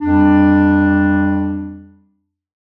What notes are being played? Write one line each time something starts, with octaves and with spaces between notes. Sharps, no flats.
F2 G3 D4